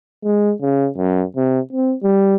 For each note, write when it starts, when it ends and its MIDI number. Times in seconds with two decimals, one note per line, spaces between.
0.24 0.53 56
0.61 0.88 49
0.97 1.24 42
1.36 1.60 48
1.72 1.94 60
2.03 2.36 55